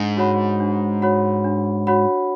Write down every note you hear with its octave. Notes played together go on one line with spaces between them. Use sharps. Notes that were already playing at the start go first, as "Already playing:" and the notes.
Already playing: G#2 D4
F#4 C#5 F#5 B5
D4
F#4 C#5 F#5 B5
D4
F#4 C#5 F#5 B5